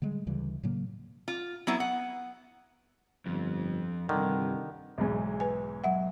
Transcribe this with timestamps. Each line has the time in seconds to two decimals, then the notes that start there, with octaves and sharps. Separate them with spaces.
0.02 D3 G3 G#3
0.27 D2 C#3 E3 G3
0.63 A2 C#3 F#3 A#3
1.28 F4
1.67 F#3 B3 E4
1.80 F#5
3.26 G1 F2
4.09 C2 G2 D3 D#3
4.98 B1 E2 G#2
5.40 B4 G#5
5.84 F#3 E5 F#5